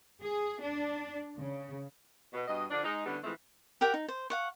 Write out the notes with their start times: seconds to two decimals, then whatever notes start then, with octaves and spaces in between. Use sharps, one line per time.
0.23 G#4
0.62 D4
1.39 C#3
2.33 B2
2.48 G2 B2 D#5
2.71 D3 F3 D4
2.84 G#3 D#4
3.06 D3 E3 G3 B3 C#4
3.24 E3 F3 G#3 A3 C4
3.81 G4 A#4 F#5 G5
3.94 D#4
4.08 C5
4.30 F5 F#5 C#6